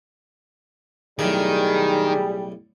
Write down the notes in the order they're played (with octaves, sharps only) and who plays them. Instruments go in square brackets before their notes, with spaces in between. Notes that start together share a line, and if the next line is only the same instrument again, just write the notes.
[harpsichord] B1 A2 D5 [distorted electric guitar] D#3 [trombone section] G3 [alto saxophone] G#4